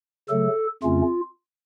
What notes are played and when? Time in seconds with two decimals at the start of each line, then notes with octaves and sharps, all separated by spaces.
0.29 C#3 F#3 A3 A4
0.83 F2 C#3 A3 C#4 F4